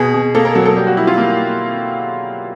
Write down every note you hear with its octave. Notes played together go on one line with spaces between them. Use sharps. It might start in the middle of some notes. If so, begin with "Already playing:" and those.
Already playing: B2 G#4
B2
A#3 A4
A#4
F#3 A4
A4
G3 G4
F#4
G3 E4
F4
A#3